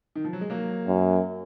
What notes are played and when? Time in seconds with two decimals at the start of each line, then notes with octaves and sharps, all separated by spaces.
0.15 D#3
0.24 F3
0.33 F#3
0.41 G#3
0.50 F#3 A#3
0.87 F#2